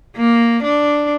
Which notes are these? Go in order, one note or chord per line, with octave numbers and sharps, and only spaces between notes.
A#3
D4